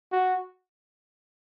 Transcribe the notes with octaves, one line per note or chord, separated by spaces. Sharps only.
F#4